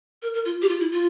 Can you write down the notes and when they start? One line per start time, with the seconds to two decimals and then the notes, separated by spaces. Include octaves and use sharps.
0.22 A#4
0.34 A#4
0.45 F4
0.62 G4
0.68 F4
0.80 E4
0.92 F4